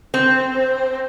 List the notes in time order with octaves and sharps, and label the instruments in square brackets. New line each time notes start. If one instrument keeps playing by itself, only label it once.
[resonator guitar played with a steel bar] C4